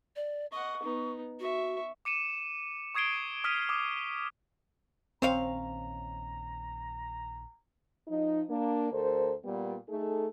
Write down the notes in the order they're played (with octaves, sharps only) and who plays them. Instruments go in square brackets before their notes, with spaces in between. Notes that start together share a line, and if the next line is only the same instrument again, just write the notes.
[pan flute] D5
[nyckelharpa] D#5 F#5 [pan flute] C#6
[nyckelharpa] B3 D#4
[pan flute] F#4 [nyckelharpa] E5 C#6
[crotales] D6 C#7 D#7 E7
C#6 D#6 G#6 C7 D7 G7
D#6 F6 B6 D7 D#7 G7
D6 D#6
[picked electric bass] A#1 D#3 C#4 [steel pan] C4 [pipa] C5 C#5 F5 [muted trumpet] A#5
[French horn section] F3 D#4
A#3 D4
D2 A4 A#4 C5
A#2 G3 B3
A3 D#4 G#4 A4